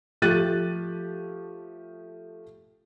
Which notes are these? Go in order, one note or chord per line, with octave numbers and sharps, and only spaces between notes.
F3 A3 G4 F#6 A6 D#7